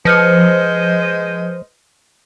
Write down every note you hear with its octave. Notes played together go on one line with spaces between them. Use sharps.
F3 G#3 B4 C5 D#5 F6 C#7